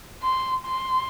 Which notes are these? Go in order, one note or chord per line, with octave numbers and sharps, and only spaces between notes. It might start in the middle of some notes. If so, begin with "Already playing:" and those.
C6
C6